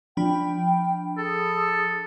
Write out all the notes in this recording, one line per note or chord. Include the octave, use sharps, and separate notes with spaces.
F3 D4 G5 B5
G#4 A4